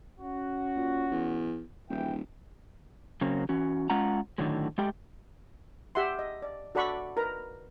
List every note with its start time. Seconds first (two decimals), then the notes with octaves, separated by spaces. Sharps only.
0.20 C#4 F#4
0.76 A#2
1.11 E2
1.89 D#1 G#1 E3 G5
3.21 C#3 F#3 A#3 C4 C#4
3.49 E3 C#4 F#4
3.90 G#3 C#4 F4 F#5 A#5
4.38 A2 D3 D#3 F#3 G#3
4.78 G#3 A3 G4 G5
5.95 G4 E5 F#5 C6
6.19 D#5
6.42 D5
6.75 F#4 A4 D5 F#5 B5 C#6
7.17 A#4 B4 A#5